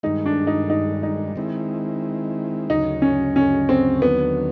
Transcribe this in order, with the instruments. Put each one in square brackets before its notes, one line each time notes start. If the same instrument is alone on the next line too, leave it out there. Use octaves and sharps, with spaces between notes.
[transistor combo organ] G2 D#3 G#3 [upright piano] D#4
[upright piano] D4
D#4
D#4
D#4
[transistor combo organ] D#3 G#3 C4 E4
[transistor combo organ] D2 C#3 F#3 [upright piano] D#4
[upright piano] C#4
C#4
C4
[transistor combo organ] D#2 D3 F#3 [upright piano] B3